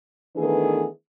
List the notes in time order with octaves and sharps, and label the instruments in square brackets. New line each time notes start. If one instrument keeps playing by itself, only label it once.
[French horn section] D#3 E3 A3 B3 D4 G#4